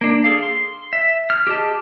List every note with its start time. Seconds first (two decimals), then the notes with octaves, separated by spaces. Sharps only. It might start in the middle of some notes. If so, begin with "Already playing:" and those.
0.01 A#3 D4
0.24 G#4 A4 F5
0.43 C6
0.93 E5
1.30 F6
1.47 G4 G#4 D#5 A5